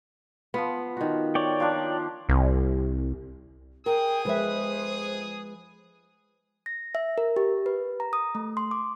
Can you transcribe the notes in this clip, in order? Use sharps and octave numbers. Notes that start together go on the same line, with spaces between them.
F3 B3 F4
D#3 F#4
C#5 D5 G5
F3 A#3 D4
C2
G#4 A#4 G5 D#6
F2 F3 G#3 B4 C5 E5
A#6
E5
A#4
G4
B4
A#5
D#6
A3
C6
D6